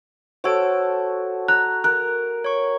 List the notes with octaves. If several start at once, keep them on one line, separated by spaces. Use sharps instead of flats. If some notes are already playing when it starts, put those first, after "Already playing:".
F#4 A4 C5 C#5 D7
A#5 F#6
A#4 F#6
C#5 C#6